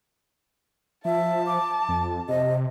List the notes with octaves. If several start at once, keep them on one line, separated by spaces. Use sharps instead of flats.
F3 E5 A5
D6
F2
C3 D#5